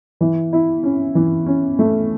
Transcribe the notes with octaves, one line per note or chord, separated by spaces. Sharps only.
E3
E4
C#4
E3
C#4
A3